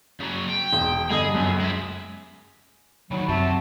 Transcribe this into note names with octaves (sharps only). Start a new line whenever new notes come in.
C#3 F#3
G5
E1
G2 D3 G#4 D#5
C#2 F#2
G#3 E4
D2 D#3 F#3 B5
F#2 C3 F#4 E5 A5